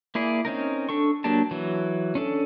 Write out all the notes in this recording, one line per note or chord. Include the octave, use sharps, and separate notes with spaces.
A#3 E4 G#4 D5
C4 C#4 D#4 A#4
D4 A4 C#6
F#3 A#3 D4 G4 A5
E3 F#3
C#4 D4 A4